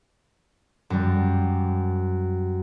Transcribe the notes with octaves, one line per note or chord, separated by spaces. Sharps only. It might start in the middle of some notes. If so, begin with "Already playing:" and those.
F#2 G3